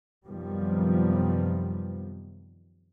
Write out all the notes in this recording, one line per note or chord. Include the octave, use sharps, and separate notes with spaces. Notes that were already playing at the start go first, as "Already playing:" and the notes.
F#2 C3 D#3 F3 G3 B3